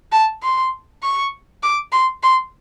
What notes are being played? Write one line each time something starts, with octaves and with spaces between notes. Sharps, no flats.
A5
C6
C#6
D6
C6
C6